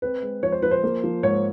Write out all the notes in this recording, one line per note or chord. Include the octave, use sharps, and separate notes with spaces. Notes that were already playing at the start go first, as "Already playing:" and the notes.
C4 B4
G#3
F3 C#5
C5
F3 B4
C5
A#3
F3
G#2 C#5